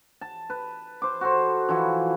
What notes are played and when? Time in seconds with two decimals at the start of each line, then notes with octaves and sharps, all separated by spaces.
0.21 A5
0.50 B4
1.02 C5 D6
1.21 F#4 A4 C5
1.69 E3 F3 E4 F#4